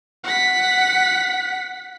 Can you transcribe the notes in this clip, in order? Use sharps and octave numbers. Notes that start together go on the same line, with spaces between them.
F#5 B6